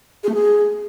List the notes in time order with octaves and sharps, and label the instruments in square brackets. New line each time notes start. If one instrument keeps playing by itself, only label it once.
[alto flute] G#4
A3
G#4